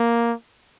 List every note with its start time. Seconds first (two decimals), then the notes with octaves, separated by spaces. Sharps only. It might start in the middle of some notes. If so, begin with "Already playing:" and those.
Already playing: A#3